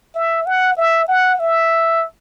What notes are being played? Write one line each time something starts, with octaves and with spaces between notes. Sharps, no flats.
E5
F#5
E5
F#5
E5